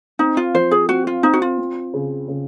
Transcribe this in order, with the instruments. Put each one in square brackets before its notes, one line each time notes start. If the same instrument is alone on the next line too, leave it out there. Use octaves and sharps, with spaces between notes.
[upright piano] C4 [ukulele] D#4
[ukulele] F4
[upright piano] F3 [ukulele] C5
[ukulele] G#4
[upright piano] C4 [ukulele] F#4
[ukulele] F4
[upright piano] C4 [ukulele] D#4
[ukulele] F#4
F4
[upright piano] C4
C#3
C#3